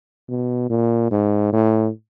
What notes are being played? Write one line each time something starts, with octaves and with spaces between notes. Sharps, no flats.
B2
A#2
G#2
A2